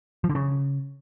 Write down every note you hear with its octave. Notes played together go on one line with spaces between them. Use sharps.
F3
D3
C#3